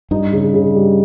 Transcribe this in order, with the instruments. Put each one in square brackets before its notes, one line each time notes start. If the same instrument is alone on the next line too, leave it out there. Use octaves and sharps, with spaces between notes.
[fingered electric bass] G2 [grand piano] D#4
[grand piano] C#3
C#3
G3